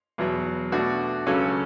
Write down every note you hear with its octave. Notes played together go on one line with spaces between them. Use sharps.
E2 B2 F#3
B2 A3 D4 F#4
C#2 C#3 F#3 C#4 A4